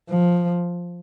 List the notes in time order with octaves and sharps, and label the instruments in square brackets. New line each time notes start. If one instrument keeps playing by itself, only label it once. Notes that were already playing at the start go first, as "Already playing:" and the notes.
[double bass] F3